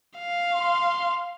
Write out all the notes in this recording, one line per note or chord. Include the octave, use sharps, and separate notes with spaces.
F5
C6